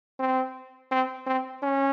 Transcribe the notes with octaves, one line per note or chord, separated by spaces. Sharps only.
C4
C4
C4
C#4